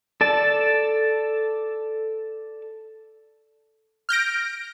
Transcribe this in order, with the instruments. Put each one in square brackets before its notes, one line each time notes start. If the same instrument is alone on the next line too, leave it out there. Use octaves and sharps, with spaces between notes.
[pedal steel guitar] A4 D5 A5
[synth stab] F6 G6 A#6 D7